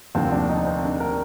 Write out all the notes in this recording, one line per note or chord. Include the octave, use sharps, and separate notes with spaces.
F1 D#2 D3 F3 C4
D4
D#4
C4
D4
A#4